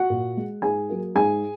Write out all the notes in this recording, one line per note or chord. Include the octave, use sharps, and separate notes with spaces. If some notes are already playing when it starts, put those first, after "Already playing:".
Already playing: F#4 F#5
A#2
G#3
G#2 G#4 G#5
F#3 A#3
G#2 G#4 G#5